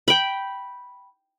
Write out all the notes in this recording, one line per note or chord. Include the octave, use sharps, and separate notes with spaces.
G5 B5